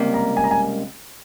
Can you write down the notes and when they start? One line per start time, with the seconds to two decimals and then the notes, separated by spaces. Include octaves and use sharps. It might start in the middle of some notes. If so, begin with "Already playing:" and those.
Already playing: C#2 C3 G3 A#3
0.14 A#5
0.37 G#5
0.44 A#5
0.51 G#5